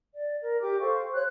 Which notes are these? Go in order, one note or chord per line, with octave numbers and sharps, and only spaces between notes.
D5
A#4
G4 D6
A4 C5 F5 C#6
C5 C#5 F#6